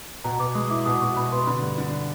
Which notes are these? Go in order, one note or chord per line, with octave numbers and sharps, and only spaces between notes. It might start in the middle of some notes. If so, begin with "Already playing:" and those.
B2 A#5
B3 D6
G#3 D#6
E4 D6
B2 D#6
B2 C#6
B2 B5
B3 C6
D3 B5
G2
D3